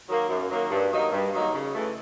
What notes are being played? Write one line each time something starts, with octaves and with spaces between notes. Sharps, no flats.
D#3 F#3 A#3
F#2
D#3 F#3 A#3
G2
D#3 F#3 A#3 D#4
G2
D#3 F#3 A#3 D#4
C#3
E3 A3